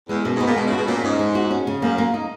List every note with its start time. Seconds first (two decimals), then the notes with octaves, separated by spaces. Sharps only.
0.09 E2 G#3
0.24 F#2 B2
0.35 G#2
0.40 B3
0.46 A#2
0.56 B2 G#3
0.67 C#3
0.72 F#4
0.77 B2
0.88 A#2 C#4
1.04 G#2 C#4
1.19 G#3
1.35 F#4
1.51 C#4
1.67 C#3
1.82 F#2 A#3
1.98 A#3
2.14 D#4